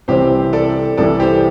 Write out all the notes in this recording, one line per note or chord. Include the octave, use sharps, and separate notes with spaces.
C2 C3 E3 C4 G4 C5
A4 D5
C2 C3 E3 A4 D5
G4 C5